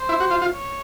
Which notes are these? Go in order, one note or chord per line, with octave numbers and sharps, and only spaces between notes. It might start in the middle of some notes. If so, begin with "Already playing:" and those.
Already playing: C5
E4
F#4
F4
F4
C#5